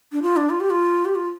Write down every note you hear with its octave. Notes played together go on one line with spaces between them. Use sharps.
D4
F4
D4
F4
G4
F4
G4
F4